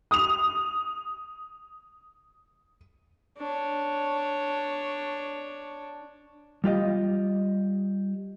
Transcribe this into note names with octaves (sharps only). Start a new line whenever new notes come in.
D#6 F7
D4 C#5
G3 F4 G4 D#5